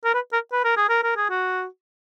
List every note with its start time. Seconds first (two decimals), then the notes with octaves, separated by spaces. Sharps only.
0.04 A#4
0.14 B4
0.33 A#4
0.52 B4
0.65 A#4
0.77 G#4
0.89 A#4
1.03 A#4
1.17 G#4
1.30 F#4